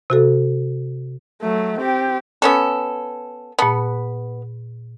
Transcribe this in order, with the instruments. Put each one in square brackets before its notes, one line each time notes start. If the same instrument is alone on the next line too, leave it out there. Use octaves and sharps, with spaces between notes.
[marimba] C3 F#4 A4
[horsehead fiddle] F#3 A3
C4 G4
[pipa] B3 C#4 A4
[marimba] A#2 A5 [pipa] B3